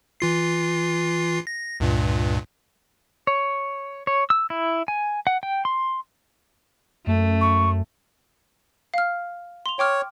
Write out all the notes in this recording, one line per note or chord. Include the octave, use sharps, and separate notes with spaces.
E3 F4 C7
A#6
C#2 G2 A#2
C#5
C#5
E6
E4
G#5
F#5
G5
C6
F#2 A3
C#6
F5 F6
C6 F7
C#5 G5 D6 F6